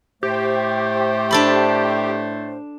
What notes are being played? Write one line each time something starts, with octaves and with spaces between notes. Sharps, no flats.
A2 A3 G4 C5
D4 A4 B5